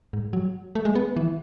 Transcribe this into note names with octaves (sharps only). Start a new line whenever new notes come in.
G#2
F#3
A3
G#3
B3
E3